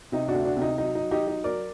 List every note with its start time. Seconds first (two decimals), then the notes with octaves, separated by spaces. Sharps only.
0.12 C3 D#4
0.28 D4 F#4
0.34 D2
0.45 D4 F#4
0.57 C3
0.62 D#4
0.78 F#3 D#4
0.95 F#3 D#4
1.11 D#4 G4
1.22 F#3
1.27 D#4
1.44 F#3 A#4 D5